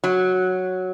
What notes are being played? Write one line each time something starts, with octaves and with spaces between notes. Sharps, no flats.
F#3